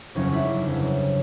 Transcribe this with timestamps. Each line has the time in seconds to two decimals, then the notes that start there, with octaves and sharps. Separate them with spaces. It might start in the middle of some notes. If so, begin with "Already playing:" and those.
0.15 G1 F2 C#3 F#3 C#4 D#4
0.32 D4 E4
0.49 D4
0.64 G1 F2 C#3 F#3